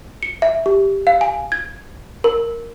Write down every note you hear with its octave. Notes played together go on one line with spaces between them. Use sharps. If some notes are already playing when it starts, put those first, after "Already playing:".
C#7
E5
G4
F5
G#5
G#6
A#4